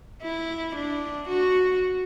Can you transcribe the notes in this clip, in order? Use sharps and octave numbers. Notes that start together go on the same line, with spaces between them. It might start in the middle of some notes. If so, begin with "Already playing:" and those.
E4
D4
F#4